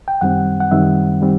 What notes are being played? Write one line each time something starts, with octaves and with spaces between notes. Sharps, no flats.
G5
F#2 D#3 G3 C4 F#5
F#5
F#2 D#3 G3 C4 E5
D#3 G3 C4